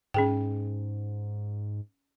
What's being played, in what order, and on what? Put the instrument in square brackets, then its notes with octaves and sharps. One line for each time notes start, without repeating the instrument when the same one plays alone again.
[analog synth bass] G#2 [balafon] C#4 G#4 G5